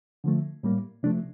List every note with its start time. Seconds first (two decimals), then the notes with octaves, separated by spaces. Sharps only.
0.24 D3 F3 A3
0.63 A2 G3 A#3
1.03 C3 F3 A3 D4